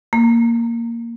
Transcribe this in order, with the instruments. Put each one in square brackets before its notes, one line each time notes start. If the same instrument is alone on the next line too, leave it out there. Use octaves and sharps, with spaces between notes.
[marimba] A#3